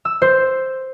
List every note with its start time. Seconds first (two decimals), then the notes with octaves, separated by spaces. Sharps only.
0.05 E6
0.22 C5